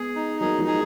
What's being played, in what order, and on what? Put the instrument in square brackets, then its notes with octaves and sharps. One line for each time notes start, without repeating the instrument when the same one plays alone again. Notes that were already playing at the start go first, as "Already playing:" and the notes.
Already playing: [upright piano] G#3 B3 [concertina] G#4
[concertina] D#4
[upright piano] F#3 A#3 [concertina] G#4
[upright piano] F3 G#3
[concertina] G#4